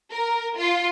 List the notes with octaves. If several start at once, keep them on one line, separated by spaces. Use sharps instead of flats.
A#4
F4